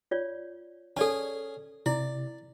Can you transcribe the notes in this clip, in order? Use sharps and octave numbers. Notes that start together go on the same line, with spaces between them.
F4 C#5 D5
C#4 G#4 A4 D5 A5
C3 E4 D5